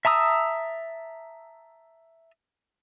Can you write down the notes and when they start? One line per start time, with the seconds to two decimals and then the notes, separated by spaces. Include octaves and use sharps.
0.05 E5 A5 A#5 D#6 E6